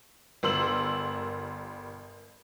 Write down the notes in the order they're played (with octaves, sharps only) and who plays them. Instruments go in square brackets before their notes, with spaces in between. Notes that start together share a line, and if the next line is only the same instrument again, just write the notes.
[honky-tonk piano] G1 A#4 C6 E6 F#7